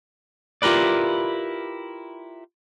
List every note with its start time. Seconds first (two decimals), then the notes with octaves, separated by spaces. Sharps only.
0.62 E4 F4 G4 A#4 B4 D5